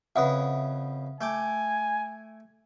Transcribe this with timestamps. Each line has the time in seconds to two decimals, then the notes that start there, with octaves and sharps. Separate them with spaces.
0.16 F2 C#3 B4 E5 F#5 D#6
1.21 A3 G5 G#5 D6